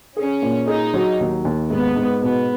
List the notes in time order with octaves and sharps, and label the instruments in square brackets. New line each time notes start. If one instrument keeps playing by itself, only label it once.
[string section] C#4 [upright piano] G#4
[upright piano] A#2
[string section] D#4 [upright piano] G#4
[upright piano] F#3
D#2
D#2
[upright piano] G#2 [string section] B3
[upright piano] G#2
[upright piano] B2 [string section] B3